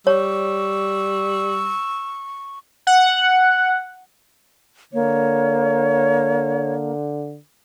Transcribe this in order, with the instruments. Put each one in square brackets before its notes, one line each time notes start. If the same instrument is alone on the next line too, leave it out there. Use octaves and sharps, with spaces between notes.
[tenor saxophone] G3 [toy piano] C#5 [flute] C#6 [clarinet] E6
[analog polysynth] F#5
[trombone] D3 [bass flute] A#3 [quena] C#5